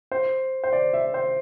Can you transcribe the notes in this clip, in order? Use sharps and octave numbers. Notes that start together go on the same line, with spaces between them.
C5
C5
D5
E5
C5